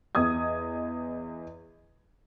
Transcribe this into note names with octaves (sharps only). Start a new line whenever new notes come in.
E2 D#5 D#6 G#6